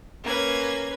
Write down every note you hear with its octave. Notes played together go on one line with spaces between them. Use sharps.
A#3 C#4 B4 G#6